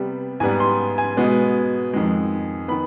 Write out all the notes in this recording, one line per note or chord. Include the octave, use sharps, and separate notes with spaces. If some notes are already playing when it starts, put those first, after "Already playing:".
Already playing: C3 G3 B3
G#2 G3 B3 G#5
C6
G#5
B2 G#3 B3
F2 D#3 G#3
D#3 B3 B5